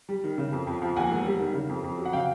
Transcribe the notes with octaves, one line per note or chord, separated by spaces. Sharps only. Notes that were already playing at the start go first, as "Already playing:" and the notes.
G3
D#3
C#3
F2
F2
F3
D#2 F#5 G#5
E1
G3
D#3
C#3
F2
F2
F#3
F#5
C#3 F5 G5